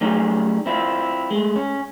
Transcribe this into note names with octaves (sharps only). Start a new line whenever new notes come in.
F#3 G3 A3 C#4 D#4 G#4
C4 E4 F4
G#3 A3
C#4